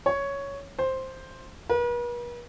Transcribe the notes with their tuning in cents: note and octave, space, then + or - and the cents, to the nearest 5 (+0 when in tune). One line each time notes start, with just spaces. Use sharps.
C#5 +5
C5 +5
B4 -45